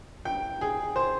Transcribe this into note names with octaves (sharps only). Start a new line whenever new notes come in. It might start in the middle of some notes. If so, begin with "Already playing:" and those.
G5
G#4
C5